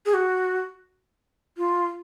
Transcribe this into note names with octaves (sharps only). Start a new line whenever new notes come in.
G#4
F#4
F4